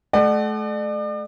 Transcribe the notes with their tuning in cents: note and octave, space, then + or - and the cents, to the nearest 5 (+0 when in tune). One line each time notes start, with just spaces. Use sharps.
A3 -35 D5 +40 F#5 +25